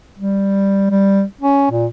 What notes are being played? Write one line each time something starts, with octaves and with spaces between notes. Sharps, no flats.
G3
G3
C#4
A#2